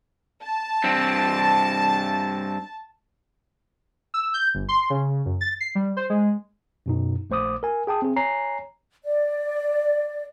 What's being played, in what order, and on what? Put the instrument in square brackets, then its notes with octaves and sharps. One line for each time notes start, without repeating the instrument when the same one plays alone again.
[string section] A5
[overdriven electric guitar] G2 C4
[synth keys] E6
G6
G1
C6
C#3
F#2
A6
C7
G3
C5
G#3
[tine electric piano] F#2 B2 D#4
A#1 A3 C5 D6 D#6
A#4 G#5
G#4 G5 A5 D#6
C4 G#4
C#5 G#5 A#5 C7
[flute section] D5